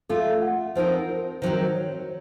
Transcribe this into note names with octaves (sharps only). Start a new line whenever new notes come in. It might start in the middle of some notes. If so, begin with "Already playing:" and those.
A3 C#4 F4 A4
F#5
F3 C4 D#4 A#4 C5
A#4
D#3 F#3 C4 D#4 C5
A#4
C5
C#5